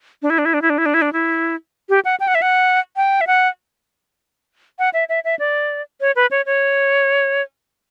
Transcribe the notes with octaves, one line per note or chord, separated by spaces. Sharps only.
D4
E4
D4
E4
D4
E4
D4
E4
D4
E4
D4
E4
G4
F#5
G5
F#5
E5
F#5
G5
E5
F#5
F#5
E5
E5
E5
D5
C#5
B4
C#5
C#5